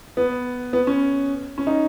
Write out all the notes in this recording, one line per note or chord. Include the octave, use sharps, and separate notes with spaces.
B3
B3
C#4
C#4
D#4